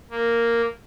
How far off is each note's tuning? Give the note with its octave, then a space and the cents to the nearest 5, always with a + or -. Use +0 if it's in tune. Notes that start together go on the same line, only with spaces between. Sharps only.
A#3 -5